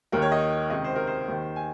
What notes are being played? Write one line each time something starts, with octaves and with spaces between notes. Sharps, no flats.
D#2 D#3 A#4
C#5
D#5
C#2 C3 D#3 D#5
C5
A#4
C5
D#2 D#3
G#5